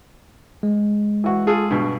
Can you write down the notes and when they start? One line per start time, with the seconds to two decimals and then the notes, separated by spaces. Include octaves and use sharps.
0.63 G#3
1.24 E3 F#4
1.47 F4 G#4 A4
1.70 G2 B2